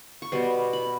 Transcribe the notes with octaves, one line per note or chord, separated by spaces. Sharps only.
C#6
B2 G3 B3 C6
B5